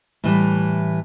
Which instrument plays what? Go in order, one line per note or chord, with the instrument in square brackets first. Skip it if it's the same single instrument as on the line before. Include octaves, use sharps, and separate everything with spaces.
[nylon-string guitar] A2 E3 G3